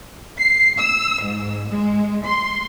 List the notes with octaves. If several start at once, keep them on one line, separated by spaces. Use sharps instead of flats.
C7
E6
G#2
G#3
C6